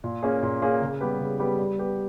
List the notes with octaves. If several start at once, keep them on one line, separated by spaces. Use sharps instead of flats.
A#2
A#3 C#4 G#4
A#2
A#3 C#4 G#4
C#3
G3 B3 G4 B4
C#3
G3 B3 G4 B4
G3
B3 G4 B4